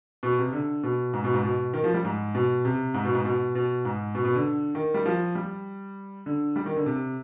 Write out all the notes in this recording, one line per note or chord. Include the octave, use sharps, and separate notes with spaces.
B2
C3
D3
B2
G#2
B2
G#2
B2
D#3
F3
G3
G#2
B2
C3
G#2
B2
G#2
B2
B2
G#2
B2
B2
D3
D#3
G3
F3
G3
D3
G3
D#3
D3
C3